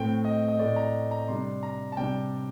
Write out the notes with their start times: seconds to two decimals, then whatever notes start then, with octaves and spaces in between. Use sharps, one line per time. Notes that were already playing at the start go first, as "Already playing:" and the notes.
Already playing: A2 A3 C4 G5
0.24 D#5
0.48 D#5
0.59 A2 A3 C4 D5
0.76 A#5
1.11 A#5
1.28 C3 G3 D4 C6
1.63 A#5
1.92 A5
1.97 C3 G3 D4 G5